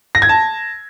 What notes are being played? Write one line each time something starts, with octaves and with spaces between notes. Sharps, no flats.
A#6
G#6
A5